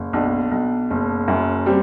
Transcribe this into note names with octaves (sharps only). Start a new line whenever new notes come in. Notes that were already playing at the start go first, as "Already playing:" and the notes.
Already playing: F#1
B1 D4
B1
F#1
F#2
G3 C4